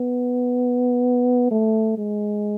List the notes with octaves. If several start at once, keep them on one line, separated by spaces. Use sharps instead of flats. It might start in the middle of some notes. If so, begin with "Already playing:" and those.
Already playing: B3
A3
G#3